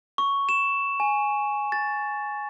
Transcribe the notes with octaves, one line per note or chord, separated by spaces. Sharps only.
C#6
E7
G#5
A6